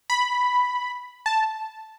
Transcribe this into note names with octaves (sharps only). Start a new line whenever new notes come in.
B5
A5